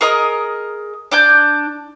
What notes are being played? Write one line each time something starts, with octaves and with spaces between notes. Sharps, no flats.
G#4 A#4 D#5 D#6
D4 D5 G6